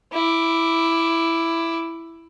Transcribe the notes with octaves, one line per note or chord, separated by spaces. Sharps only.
E4 D6